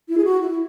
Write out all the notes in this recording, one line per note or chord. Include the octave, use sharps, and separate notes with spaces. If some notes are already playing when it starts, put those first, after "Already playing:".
E4
G#4
F#4
E4